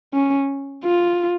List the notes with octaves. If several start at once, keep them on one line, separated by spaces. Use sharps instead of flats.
C#4
F4